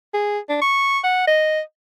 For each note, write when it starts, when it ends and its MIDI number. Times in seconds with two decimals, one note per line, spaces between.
0.14 0.39 68
0.49 0.57 62
0.61 0.99 85
1.04 1.26 78
1.27 1.60 75